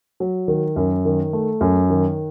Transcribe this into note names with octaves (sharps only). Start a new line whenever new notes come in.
F#3
D#3
F#2
D#3
A3
F#2
D#3